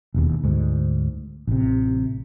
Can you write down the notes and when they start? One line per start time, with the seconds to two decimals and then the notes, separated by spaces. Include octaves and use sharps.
0.14 E1 D#2
0.44 D2 G#2
1.47 A1 C3